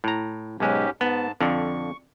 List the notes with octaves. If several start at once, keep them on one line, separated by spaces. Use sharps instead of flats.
A2 A#5
B1 G#2 G#3 C#4 G4
G#2 B3 A5
F2 D3 C#6